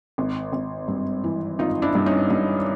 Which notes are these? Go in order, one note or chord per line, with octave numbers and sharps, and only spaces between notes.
G#1
G#1
G2
E3
G#1 D#4 F4
D4 E4
G2
C#4 D#4
G2